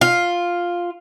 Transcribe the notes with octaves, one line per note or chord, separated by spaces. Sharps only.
F4